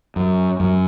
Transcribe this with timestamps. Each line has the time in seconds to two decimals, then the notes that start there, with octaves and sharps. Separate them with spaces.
0.16 F#2
0.60 F#2